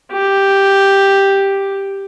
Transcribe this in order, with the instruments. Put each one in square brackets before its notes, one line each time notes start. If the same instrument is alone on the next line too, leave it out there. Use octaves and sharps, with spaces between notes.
[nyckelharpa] G4